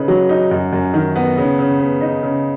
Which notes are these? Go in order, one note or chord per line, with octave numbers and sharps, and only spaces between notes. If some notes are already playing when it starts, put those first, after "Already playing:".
Already playing: C#3 D#4 B4
F#3
D#4
F#2
F#2
D#3
B3
C#3
C#3
B3
D#4
C#3